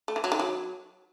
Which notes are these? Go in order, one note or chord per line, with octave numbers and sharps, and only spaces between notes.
A3
E3
F#3
D#3
F#3